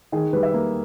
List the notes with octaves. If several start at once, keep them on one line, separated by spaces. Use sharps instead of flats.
D#3 G#4
G3 B4
E5
A#3